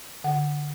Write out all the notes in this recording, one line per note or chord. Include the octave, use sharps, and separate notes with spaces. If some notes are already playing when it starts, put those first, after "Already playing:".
D3 F#5